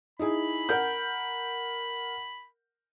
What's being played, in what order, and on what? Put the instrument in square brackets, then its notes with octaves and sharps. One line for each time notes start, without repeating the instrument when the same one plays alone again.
[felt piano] D#4 E4 G#4 [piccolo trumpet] B5
[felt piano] A#4 F#5 G6